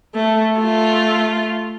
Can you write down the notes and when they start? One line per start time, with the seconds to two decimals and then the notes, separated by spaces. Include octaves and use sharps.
0.15 A3
0.58 A3 F4